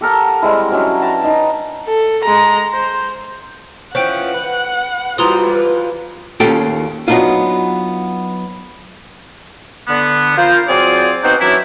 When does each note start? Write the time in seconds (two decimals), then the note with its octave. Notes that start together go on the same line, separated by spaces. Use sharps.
0.01 G4 A4 A#4 F#5
0.42 G3 G#3 C4 E4
0.71 F#3 C#4 D4 E5
1.02 B4 G5 A5 A#5
1.24 D#4
1.87 A4
2.24 G#3 A#5
2.73 C5
3.95 E3 F3 C#4 C5 F#5 G5 G6
4.34 B4
5.18 E3 F3 G3 F4 F#4 A#5 C6 D#6
5.51 B4
6.40 D#2 C#4 F4 G4 A4 G5
7.08 F#3 B3 D4 D#4 F4
9.88 D3 B3
10.37 F4 A#4 C5
10.68 F#3 C4 F4 G#4 D5
11.24 B3 C4 D#4 F#4 C5
11.40 E3 F#3 C#4 D4 E4